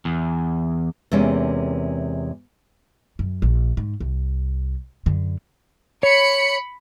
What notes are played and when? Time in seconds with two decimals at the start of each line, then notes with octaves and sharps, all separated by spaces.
0.05 E2
1.12 E2 C3 G#3 A#3 C#4
3.19 F#2
3.42 A#1
3.77 G#2
4.00 C2
5.06 F#2 D3
6.03 C#5 B5 C#7